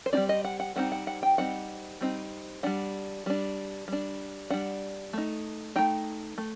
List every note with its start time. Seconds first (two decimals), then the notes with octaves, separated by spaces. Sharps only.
0.06 C5
0.13 G3 C4 D#4 D5
0.29 D#5
0.44 F#5
0.60 F#5
0.76 G3 C4 D#4 F#5
0.92 F#5
1.07 F#5
1.23 G5
1.38 G3 C4 D#4 F#5
2.01 G3 C4 D#4
2.63 G3 D4 F#5
3.26 G3 D4
3.88 G3 D4
4.50 G3 D4 F#5
5.13 A3 D#4
5.76 A3 D#4 G5
6.38 A3